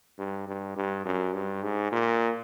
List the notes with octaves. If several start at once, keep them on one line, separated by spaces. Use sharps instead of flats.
G2
G2
G2
F#2
G2
G#2
A#2